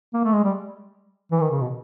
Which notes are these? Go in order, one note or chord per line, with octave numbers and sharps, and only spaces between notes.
A#3
A3
G#3
G3
E3
D#3
C#3
B2